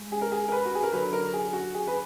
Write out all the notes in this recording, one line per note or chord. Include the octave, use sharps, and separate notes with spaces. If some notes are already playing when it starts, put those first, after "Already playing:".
Already playing: G#3
G#4
A#4
G#4
A#4
B4
F#4
G#4
A#4
D3 F#3 B4
A#4
G#4
F#4
G#4
B4